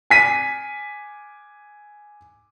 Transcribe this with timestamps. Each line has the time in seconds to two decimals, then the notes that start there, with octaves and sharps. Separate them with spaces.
0.10 G#5 B6 D#7